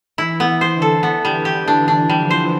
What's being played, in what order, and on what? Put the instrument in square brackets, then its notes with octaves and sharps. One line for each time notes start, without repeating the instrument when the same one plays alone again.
[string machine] E3 [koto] E4
[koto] B3
[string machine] E3
[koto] C5
[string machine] D3
[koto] A4
B3
G3
G4
D4
[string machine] E3 [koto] D4
[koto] G3
[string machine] D3 F3
[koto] C5